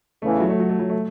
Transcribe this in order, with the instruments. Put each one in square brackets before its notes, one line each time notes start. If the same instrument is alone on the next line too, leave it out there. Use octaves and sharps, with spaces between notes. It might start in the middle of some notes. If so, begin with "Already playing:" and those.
[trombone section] E2 C#3 E3 [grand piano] A3
[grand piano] F#3
A3
F#3
A3
F#3
A3